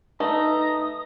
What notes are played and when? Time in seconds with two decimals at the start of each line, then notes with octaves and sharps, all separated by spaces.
0.20 A3 D#4 B4 D#5 A#5 D#6